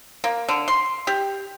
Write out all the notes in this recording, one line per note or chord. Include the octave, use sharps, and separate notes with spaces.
A#3
D3
C6
G4